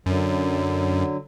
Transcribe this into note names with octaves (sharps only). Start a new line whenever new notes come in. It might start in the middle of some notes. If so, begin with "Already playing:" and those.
F#2 D3 F#3